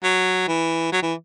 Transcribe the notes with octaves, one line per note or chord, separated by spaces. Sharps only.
F#3
E3
F#3
E3